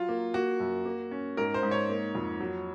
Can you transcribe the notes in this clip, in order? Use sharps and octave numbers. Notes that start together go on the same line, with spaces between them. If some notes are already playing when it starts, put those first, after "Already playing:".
Already playing: F#3 F4
A#3
A#3 F#4
F#2
A#3
C#4
G#2 A#4
C5
G#2
C#5
A#3
F2
F#3